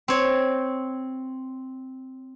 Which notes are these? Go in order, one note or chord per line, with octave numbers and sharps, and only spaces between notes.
C4 C#5